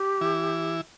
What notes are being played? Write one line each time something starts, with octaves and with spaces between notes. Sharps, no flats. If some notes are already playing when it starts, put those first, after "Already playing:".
Already playing: G4
E3 E4